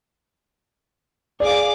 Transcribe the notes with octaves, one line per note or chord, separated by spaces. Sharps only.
G#4 D5 F5 D6